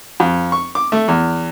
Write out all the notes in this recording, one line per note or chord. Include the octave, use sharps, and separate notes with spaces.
F2
C#6
D6
A3
E2